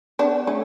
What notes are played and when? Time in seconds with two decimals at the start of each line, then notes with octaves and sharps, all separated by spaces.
0.19 B3 D4
0.47 A3 C#4